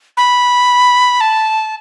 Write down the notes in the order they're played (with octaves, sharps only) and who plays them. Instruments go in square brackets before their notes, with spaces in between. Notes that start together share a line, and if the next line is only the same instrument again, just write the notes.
[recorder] B5
A5